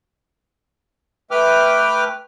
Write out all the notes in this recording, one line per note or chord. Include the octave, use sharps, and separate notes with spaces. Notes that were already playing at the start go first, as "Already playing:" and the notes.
A3 B4 G5 D6 F6